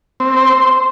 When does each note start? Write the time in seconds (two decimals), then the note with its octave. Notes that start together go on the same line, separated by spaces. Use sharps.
0.20 C4
0.37 C5